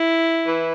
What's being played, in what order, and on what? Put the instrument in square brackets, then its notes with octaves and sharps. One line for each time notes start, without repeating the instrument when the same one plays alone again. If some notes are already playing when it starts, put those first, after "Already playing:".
Already playing: [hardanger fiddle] E4
[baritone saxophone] E3